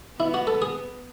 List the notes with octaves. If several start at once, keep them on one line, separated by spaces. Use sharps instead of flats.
B3 E4
F#4
A4
G#4